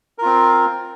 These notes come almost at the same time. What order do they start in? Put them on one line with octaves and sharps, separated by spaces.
A#4 F4 C4